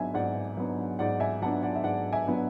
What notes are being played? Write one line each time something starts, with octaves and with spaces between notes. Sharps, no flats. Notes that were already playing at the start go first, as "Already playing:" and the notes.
Already playing: G#2 F#3 B3 D4 E5 G#5
G#2 D5 F#5
F#3 B3 D4
G#2 D5 F#5
E5 G#5
F#3 B3 D4 F#5 A5
D5 F#5
E5
G#2 D5 F#5
E5 G#5
F#3 B3 D4